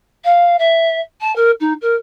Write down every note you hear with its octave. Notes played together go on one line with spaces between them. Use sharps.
F5
E5
A5
A#4
D#4
A#4